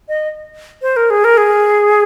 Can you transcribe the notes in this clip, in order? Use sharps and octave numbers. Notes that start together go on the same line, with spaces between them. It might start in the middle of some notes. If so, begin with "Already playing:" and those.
D#5
C5
A#4
G#4
A#4
G#4